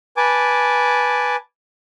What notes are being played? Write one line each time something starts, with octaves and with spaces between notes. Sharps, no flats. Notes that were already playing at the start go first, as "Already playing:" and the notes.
B4 G#5 A5 D6